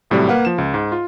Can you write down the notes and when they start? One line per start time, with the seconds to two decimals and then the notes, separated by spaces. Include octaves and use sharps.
0.10 G#1 A2 C3 F#3 G3
0.29 A#3 B4 F5 F#5
0.45 F3 E7
0.58 C#2
0.74 G#2
0.92 F4